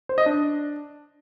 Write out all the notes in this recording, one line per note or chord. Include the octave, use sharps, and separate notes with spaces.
C5
D#5
D4